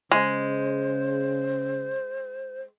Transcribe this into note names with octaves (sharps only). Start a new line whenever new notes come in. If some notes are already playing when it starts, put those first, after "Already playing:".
C#3 G#3 C5